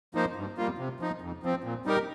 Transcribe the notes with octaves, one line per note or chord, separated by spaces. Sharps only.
F3 A#3 D#4 C5
G2
G3 A#3 F4
C3
F3 D#4
F2
F3 C4
A#2
G3 D#4 G4 A#4